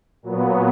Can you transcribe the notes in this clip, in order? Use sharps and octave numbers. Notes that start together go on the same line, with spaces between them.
A#2 F#3 B3